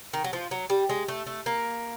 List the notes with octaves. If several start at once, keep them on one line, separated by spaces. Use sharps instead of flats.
D#3
F#3
F3
F#3
G3
G#3
A3
A3
A#3